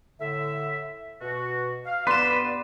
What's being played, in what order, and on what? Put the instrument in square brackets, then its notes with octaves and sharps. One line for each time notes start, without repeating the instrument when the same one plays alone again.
[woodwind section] A2 D3 E5
B2 F#4
F5
[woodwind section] G2 B3 D5 [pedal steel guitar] B4 [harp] C6 E7